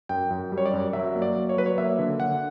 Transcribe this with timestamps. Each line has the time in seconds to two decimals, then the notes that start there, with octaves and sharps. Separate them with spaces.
0.09 F#2 G5
0.30 F#2
0.52 G3
0.58 C#5
0.66 D5
0.73 F#2
0.93 F#3 E5
1.15 A#3
1.22 D5
1.36 F#3
1.49 C#5
1.57 F#3 B4
1.66 C#5
1.78 A#3 E5
1.99 D3
2.19 D3 F#5